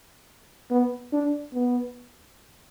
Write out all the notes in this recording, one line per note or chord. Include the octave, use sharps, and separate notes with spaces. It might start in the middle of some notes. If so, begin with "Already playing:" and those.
B3
D4
B3